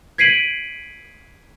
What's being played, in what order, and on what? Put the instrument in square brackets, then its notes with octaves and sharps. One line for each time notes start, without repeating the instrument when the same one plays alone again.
[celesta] G#6 B6 C7 D7 D#7 F#7